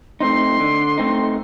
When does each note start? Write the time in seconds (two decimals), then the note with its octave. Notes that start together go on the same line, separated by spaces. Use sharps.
0.20 A3 C4 D#4 C6
0.60 D3
0.98 A3 C4 D#4